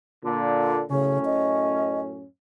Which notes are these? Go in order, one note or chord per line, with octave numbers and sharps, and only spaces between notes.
A#2 D3
F#2 A2 C#3 C#4
D#5